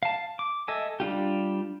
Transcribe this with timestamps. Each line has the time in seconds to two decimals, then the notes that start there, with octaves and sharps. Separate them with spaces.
0.03 F5 A5
0.39 D6
0.68 A4 D#5 E5 G#5
1.00 G3 D4 F4 G4